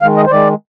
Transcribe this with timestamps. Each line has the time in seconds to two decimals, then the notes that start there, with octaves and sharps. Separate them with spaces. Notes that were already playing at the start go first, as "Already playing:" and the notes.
0.02 D#3 G#3 F5
0.17 D#5
0.27 C5
0.31 D#3 G#3 D5